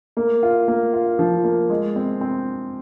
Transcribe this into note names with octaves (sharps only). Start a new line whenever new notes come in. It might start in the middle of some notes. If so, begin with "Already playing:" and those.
A#3
F4
A#3
F4
F3
A#3
G#3
C4
C4